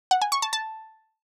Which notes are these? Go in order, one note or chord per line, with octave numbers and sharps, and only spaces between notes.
F#5
G#5
C#6
A5
A5